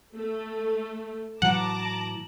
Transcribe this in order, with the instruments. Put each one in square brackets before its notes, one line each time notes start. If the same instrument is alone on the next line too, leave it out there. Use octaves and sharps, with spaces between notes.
[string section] A3
[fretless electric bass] A2 E3 F#3 [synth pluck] F#5 [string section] A5 A#5 D6 [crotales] F#7